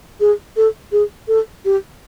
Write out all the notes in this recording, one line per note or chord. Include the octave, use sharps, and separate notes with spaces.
G#4
A4
G#4
A4
G4